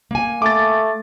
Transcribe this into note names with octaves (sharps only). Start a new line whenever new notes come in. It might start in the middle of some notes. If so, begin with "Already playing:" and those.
A#3 G#5
A3 D6 A6